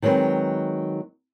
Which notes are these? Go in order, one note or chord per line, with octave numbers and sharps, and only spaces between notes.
D#3 F#3 G#3 C4 B4